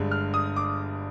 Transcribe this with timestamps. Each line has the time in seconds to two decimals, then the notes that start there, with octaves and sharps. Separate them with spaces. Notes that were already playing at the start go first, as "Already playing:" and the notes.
Already playing: G1 G2 D3 G#3
0.11 F6
0.34 D#6
0.56 D6